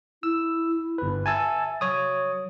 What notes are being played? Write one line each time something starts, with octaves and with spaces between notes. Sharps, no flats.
E4 E6
G1 B4
E5 G#5 A5 E6
F#3 C#5 D#6